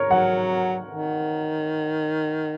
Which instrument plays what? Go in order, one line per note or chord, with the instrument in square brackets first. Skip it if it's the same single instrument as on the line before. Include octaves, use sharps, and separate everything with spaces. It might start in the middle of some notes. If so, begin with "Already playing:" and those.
Already playing: [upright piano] A#4 C#5
[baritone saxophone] F#3 [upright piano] F#5
[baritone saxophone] D#3